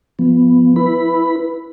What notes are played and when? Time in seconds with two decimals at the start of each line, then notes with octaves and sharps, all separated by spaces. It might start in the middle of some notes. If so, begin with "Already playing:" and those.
0.19 F3 B3
0.76 E4 B4 B5